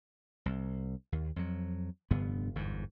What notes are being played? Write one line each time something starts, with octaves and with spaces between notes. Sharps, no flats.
C2
D#2
F2 F#3
F1 G2 D3 B3
G1 E2 G#2